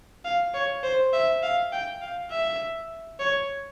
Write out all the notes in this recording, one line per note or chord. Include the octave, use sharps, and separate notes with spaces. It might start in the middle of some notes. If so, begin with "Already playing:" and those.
F5
C#5
C5
E5
F5
G5
F5
E5
C#5